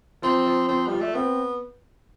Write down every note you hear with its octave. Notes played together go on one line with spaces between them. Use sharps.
F3 C4
F3
F3 C4
G3 F4
A3
B3 C4